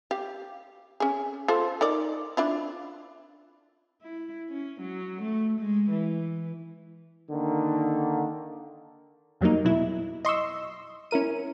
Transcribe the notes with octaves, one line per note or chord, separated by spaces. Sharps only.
G4 F5
C#4 G#4
F4 A4 C5
D#4 A#4 D5
D4 E4 F4
E4
C#4
F#3
A3
G#3
E3
D3 D#3 A#3
F2 F#3 G3 A#3 D#4
B2 F#3 E4
D#5 C6 C#6 E6
C#4 E4 A#4 D#7